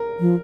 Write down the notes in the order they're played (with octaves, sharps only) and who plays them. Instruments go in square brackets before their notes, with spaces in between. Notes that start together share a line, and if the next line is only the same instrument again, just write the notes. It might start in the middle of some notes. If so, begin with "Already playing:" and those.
Already playing: [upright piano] A#4
[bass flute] F3